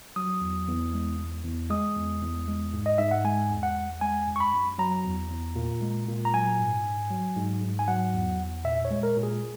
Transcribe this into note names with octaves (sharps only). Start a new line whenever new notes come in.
F#3 D#6
E2
E2
G#3
E2
E2
G#3 D#6
E2
E2
G#3
G#2
D#5
G#2 E5
F#5
G#3 G#5
E2
F#5
E2
G#3 G#5
F#2
C#6
B5
F#2
F#3 A#5
E2
E2
A#2
G#3
A#2
A#5
F#3 G#5
G#2
G#2
F#3
G#2
G#2
G#5
F#3 F#5
E2
E2
A#2 E5
C#5
G#3
A#4
A#2
G#4